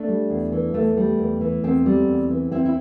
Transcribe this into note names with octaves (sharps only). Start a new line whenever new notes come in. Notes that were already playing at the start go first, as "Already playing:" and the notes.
Already playing: A3 D4
G3
E2
E3
E2 A3
G3
E2
E3
E2 C4
G3
E2
E3
E2 C4 E4
E4